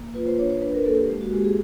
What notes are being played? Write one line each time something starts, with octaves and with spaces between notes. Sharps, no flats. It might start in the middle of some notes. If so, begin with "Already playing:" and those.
Already playing: A#3
F4 B4
C5
D4 C#5
C5
D4 B4
A#4
A#3 A4
G4
G#3
F#4
G#3 G4
G#4